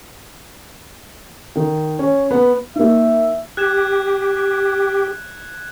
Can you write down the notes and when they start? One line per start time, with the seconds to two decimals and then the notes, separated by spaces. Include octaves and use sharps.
1.56 D#3
1.99 C#4
2.31 B3
2.76 A#3 D#4 E5
3.57 G4 F#6 G#6 E7